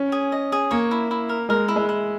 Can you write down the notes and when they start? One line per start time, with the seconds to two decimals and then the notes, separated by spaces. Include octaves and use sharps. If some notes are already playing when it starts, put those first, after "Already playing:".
Already playing: C#4
0.12 G#4
0.32 D#5
0.52 G#4
0.71 A#3 C#5
0.91 E4
1.11 E4
1.29 A#4
1.49 G#3 A#4
1.68 E4
1.76 G#3
1.89 E4